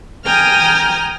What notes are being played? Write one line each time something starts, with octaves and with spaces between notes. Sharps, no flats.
G5 G#5 A#5 D#6 F6